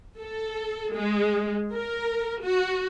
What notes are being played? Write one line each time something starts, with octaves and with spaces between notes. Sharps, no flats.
A4
G#3
A#4
F#4